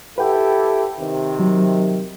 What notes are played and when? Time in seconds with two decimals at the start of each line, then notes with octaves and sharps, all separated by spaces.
0.18 E4 G4 A4 B4 F#5 G5
1.00 C3 D#3
1.40 F#3